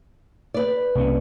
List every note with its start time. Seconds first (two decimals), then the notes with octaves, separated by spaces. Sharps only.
0.54 B4 D5
0.95 C2 A#3 C#4